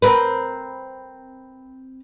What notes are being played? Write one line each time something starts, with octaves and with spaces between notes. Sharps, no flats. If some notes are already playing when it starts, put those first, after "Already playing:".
C4 A#4 B4